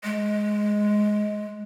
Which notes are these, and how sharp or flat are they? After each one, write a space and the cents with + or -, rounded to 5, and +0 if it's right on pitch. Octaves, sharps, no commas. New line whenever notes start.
G#3 +10